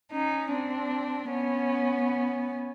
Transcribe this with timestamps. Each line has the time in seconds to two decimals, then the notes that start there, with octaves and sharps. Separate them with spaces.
0.12 C#4 D#4
0.51 C4 D4
1.31 B3 C#4